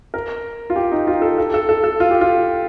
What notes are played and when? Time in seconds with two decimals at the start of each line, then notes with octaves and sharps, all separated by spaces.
0.14 A#4
0.70 F4
0.76 G4
0.92 D#4
1.07 F4
1.22 A4
1.38 A4
1.54 A4
1.69 A4
1.84 A4
2.00 F4
2.11 G4
2.21 F4